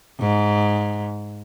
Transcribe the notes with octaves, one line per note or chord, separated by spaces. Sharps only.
G#2